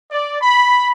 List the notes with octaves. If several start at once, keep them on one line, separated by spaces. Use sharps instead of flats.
D5
B5